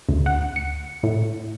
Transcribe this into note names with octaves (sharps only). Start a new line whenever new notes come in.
D2
F#5
C#7
A2